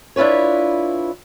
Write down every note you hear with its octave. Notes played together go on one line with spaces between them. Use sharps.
D4 E4 F4 B4 C#5